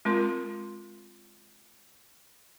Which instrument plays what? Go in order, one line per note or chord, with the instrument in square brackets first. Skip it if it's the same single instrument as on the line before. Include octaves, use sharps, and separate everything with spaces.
[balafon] G#3 C4 F4 A#4 C6